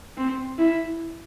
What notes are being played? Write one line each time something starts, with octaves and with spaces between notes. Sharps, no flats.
C4
E4